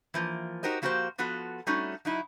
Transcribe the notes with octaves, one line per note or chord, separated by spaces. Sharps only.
E3 F3 A#3
D#4 F#4 G4 A#4 C5 D#5
F3 A#3 F#4 G4 A#4 C5
F3 B3 F4 F#4 A4
G3 A3 C#4 D#4 F#4
F#3 D#4 E4